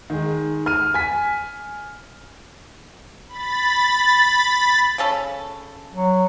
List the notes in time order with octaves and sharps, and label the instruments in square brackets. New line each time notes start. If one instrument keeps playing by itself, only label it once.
[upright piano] D#3 G#3
F6 D#7
G#5 B6
[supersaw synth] B5 A6
[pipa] C#3 C#4 A4
[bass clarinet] F#3